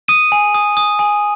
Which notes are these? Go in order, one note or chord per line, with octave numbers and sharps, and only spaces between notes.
D#6 D#7
G#5
D#6
D#6
G#5